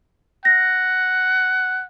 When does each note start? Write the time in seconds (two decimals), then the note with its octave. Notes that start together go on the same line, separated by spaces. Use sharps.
0.45 F#5 A#6